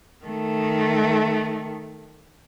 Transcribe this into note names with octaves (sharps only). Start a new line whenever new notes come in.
D#3 A3